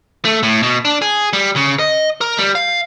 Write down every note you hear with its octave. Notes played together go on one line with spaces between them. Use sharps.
A3
A2
B2
D4
G#4
G3
C#3
D#5
A#4
G3
F5